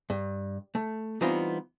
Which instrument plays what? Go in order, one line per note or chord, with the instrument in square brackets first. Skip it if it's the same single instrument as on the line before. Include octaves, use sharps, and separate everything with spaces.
[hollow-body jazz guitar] G2
A3
E3 G3 B3 C4 D#4 F4